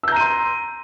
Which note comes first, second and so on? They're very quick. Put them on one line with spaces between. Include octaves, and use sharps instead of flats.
E6 G6 A#5 D#7 C6